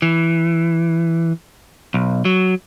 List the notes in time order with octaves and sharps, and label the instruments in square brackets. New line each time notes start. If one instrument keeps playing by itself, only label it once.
[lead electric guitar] E3
B1
F#3